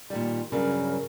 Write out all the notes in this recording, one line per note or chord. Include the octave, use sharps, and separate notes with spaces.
A#2 D#3 G3
G2 C#3 F#3 A#4